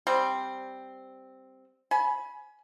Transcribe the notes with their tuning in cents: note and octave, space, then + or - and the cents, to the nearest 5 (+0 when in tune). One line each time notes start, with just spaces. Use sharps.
G3 +0 C4 +0
G#5 +25 B5 -10